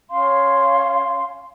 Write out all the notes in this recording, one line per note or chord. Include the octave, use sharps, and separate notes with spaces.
C#4 F5 C6